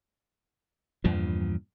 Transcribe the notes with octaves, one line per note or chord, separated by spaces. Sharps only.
E2 G2 A#2 F3